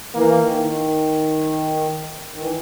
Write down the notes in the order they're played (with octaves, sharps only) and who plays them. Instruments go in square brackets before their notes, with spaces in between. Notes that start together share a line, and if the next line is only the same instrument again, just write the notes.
[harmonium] E3 [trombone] A#3
[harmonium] D#3
D#3
D#3
E3